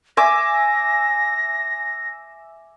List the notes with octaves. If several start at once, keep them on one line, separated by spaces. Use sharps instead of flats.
E5 G#5 D6 A#6